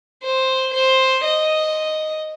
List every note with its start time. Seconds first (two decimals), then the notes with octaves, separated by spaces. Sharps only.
0.23 C5
0.73 C5
1.23 D#5